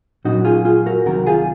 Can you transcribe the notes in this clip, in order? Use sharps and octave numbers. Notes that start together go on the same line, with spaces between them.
A#2 F#3 C#4 D#4 F#4
F4 G#4
F4 G#4
F#4 A#4
C2 C3 D#3 F#3 F#4 A#4
F4 G#4